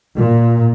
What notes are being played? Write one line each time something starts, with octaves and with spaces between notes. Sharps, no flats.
A#2